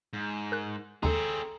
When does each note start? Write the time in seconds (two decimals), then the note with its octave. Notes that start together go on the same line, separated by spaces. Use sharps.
0.13 G#2
0.52 A#4 F#6
1.03 D#2 C#3 G#3 C4 G#4 A4 A#5